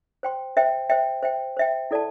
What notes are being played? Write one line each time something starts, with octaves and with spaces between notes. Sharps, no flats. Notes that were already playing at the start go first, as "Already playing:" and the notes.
C5 G5 C6
C5 E5 G5
C5 E5 G5
C5 E5 G5
C5 E5 G5
E4 A4 D5 A5